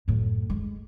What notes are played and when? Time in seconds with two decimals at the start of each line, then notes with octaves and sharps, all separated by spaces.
0.08 F#2 A2
0.50 G#3